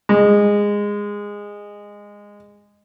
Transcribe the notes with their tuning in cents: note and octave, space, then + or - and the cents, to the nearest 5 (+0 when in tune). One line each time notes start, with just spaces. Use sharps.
G#3 -15